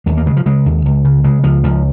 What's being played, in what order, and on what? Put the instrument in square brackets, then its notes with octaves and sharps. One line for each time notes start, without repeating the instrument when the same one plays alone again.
[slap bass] D#2 G#3
A#3
C#3 G#3
F3
C#3 G#3
D#2
C#2
C#3
C#3 G#3
C#2 F3
C#2 F3